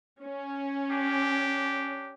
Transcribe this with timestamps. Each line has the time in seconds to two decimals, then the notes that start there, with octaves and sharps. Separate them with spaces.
0.21 C#4
0.90 D4 G4